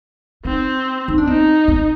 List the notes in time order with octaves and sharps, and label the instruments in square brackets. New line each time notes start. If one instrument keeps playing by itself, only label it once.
[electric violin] C4 [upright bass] D#4
[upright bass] D#4
D4
[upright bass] C4 [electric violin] D#4
[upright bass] C4